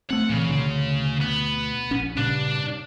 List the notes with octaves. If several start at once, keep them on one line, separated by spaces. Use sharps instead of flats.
A3 C4 F#5
A#2 C#3 E3
D2 B2 D3
B3
A#1 C#4
G2 A#2 C#3 D4